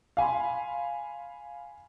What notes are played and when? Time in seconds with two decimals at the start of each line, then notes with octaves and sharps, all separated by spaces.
0.17 F5 G#5 B5 C6